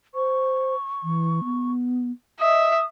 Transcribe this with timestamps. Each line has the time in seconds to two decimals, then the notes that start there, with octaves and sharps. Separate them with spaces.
0.15 C5 C#6
1.03 E3
1.44 B3
2.40 D#5 E5 D#6